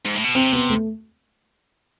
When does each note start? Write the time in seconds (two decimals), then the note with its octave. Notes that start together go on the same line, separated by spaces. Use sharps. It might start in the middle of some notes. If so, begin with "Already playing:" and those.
0.06 G#2
0.15 A2
0.24 B2
0.35 C3 C4
0.53 B3
0.70 A3